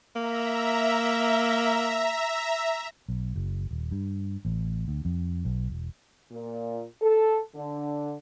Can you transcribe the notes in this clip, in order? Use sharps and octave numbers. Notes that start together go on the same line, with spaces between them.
A#3 E5 A#5
B1
F#1
D#1
G2
A1
D2
F2
B1
E1
A#2
A4
D3